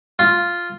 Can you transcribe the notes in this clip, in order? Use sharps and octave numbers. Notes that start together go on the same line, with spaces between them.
F4